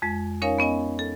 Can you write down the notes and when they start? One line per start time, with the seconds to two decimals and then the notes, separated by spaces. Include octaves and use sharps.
0.02 F2 G#3
0.42 C#4 D#4 A#4 C#5 F5 G#5
0.59 B3 C#4 D#5 G#5
0.99 A4